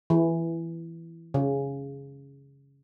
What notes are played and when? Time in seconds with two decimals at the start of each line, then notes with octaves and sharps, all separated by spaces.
0.10 E3
1.34 C#3